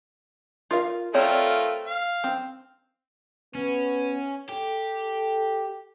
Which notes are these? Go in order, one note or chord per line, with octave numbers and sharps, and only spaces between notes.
F4 A#4 F5
A3 C4 F4 A#4 C#5 D5
F5
C4
B3 C#4
G4 A4